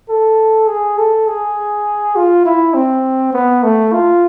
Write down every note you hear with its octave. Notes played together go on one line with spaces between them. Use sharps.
A4
G#4
A4
G#4
F4
E4
C4
B3
A3
F4